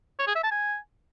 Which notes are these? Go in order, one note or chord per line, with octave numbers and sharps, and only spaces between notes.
C#5
G#4
E5
A5
G#5